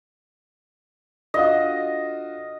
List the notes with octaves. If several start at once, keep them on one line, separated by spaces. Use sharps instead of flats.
D3 F4 F#4 D#5